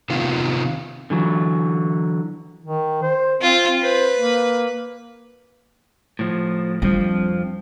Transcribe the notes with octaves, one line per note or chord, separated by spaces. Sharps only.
C3 D#3 B3 F4
D3 E3 F#3
D#3
C5
C4 F4
B4 C5
A#3
A2 F3
F2 F3 G3 D4